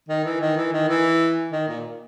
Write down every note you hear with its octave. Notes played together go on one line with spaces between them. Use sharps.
D#3
E3
D#3
E3
D#3
E3
D#3
A#2